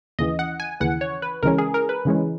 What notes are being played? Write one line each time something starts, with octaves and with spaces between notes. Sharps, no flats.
D#2 C#3 E3 D#5
F#5
G#5
D#2 C#3 E3 F#5
C#5
B4
C#2 C#3 E3 G#3 C#4 A#4
G#4
A#4
B4
C#2 C#3 E3 G#3 C#4